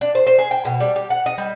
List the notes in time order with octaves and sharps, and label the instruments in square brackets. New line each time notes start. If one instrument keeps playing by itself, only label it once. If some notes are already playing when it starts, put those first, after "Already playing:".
[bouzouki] D4
C5
C5
G#4
G5
B2
G3
G4
F#5
D#5
G3